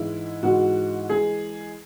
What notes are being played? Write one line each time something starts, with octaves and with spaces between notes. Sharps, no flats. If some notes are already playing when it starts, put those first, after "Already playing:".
Already playing: G#2 E3 G#3 E4
G#2 E3 G#3 F#4
E3 G#3 G#4